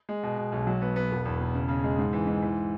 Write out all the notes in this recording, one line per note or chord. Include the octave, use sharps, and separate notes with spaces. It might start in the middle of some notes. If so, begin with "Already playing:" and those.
G#3
B2
B2
B1
F#3
B3
B3
E1
E2
E1
C#3
C#3
G#3
G#2
E3
G#2
E3